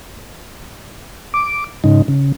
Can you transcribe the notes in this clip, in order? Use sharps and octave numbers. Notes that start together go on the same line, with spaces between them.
D6
G#2 C#3 D#4
C#3